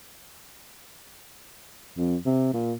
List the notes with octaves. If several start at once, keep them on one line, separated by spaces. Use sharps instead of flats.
F2
C3
A#2